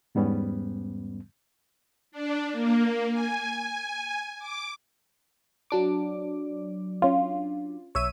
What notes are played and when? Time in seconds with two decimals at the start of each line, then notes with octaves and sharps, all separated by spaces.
0.15 E2 G#2 G3 B3 C#4
2.12 D4
2.52 A#3
3.12 G#5
4.39 D6
5.70 F#3 D4 D6
7.02 C#4 F4
7.95 B1 C#5 E5 E6 D#7